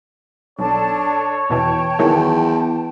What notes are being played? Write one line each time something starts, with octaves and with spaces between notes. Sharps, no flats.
B1 D4 A4 C#5 A5
E2 B2 E3 G5 A5
E2 D#3 E3 F#3